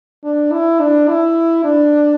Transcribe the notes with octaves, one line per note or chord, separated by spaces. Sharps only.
D4
E4
D4
E4
D4